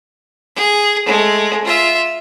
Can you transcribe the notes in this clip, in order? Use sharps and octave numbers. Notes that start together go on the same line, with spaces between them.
G#4
G#3 A3
F4 E5